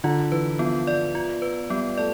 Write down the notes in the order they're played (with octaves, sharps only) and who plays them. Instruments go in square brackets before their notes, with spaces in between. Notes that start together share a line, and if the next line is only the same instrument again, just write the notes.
[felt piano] D3 [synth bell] F4
[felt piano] E3 [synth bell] B4
[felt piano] F3 [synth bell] B3
[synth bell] D5
F4
B4
[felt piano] G3 [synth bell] B3
[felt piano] A3 [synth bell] D5